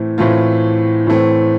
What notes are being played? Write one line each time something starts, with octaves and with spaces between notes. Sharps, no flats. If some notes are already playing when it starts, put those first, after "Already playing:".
Already playing: A2 E3 A3 C4
A2 E3 A3 C4 F4
A2 E3 A3 C4